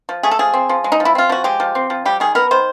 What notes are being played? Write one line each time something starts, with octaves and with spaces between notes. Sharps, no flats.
F3
A3 G#4
A4
F3 G#4
C4
F3
G#3
D#4
F3
E4
C4 F4
F3 F#4
G#3 G4
F3
C4
F3
G3 G4
D#3 G#4
B3 A#4
D#3 C5